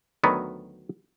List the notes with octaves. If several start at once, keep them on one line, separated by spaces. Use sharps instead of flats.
D2 D#3 F#3 B3